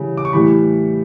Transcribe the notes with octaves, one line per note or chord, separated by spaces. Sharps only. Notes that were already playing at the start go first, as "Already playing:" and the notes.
Already playing: C#3 E3 G3
D6
C#6
A2 E3 G3 B5